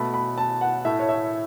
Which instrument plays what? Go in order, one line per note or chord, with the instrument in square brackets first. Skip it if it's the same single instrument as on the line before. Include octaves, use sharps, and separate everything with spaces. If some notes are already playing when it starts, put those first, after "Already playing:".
Already playing: [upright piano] B2 A3 B5
B5
A5
F#5
A2 A3 E5
C#5
E5